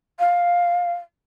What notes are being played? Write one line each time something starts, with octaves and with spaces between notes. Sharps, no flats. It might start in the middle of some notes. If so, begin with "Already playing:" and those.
F5